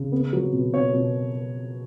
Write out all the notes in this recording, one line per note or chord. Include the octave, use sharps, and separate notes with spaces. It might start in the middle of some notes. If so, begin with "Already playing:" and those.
Already playing: C#3
B3
F#3
B2
B2 C#5
B2